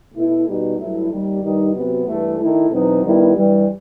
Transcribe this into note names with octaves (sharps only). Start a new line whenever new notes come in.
B2 A3 E4
B2 G3 D#4 F#4
G2 F#3 A3 E4
D#2 D#3 G3
G2 D#3 G3 D#4
C3 F#3 B3 F#4
G2 E3 A3
D#3 A3 E4
E2 B2 F#3 C4 D#4
G2 D#3 G3 B3 E4
G2 E3 G3